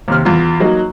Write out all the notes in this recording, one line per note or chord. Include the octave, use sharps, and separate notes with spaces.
D#2 C3 F6
E2 F4
F#3 A#3 D#4